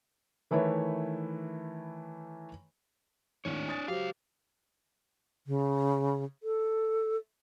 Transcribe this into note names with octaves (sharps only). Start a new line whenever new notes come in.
D#3 E3 A3 E4 B4 C#5
G#1 D#2 A2 D4 C#5
G#5 D#6 A6
C#2 F#3 G4 C5 F5
C#3
A4